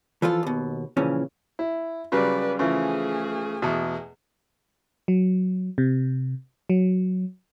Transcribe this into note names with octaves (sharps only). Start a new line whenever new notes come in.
E3 F3 F4 A4
D#2 B2
A#2 C#3 E3 F3 C#4
E4
C#3 F#3 G3 B4 D5
C#3 E3 F3 A3 G#4
E2 B2
F#3
C3
F#3